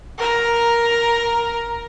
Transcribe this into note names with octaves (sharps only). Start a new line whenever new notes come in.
A#4 A#5